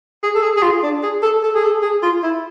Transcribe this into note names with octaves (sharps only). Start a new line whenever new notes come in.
G#4
A4
G#4
G#4
F4
D4
G#4
A4
A4
G#4
A4
G#4
F4
E4